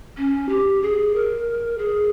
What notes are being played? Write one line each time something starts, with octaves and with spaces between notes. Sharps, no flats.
C#4
G4
G#4
A#4
G#4